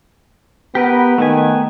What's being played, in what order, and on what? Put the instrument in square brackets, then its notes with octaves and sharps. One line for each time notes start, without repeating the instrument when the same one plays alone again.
[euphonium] B3 [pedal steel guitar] G4 A#4 B4
[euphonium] D#3 [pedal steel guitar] A3 B3 G#5